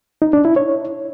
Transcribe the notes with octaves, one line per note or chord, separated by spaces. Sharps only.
D#4
D4
E4
C#5